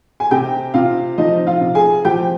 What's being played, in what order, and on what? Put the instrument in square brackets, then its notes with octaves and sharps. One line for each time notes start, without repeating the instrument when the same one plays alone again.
[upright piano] G#5
C3 G4 G5
C3 F4 F5
F3 D#4 D#5
F4 F5
C3
G#4 G#5
F3 G4 G5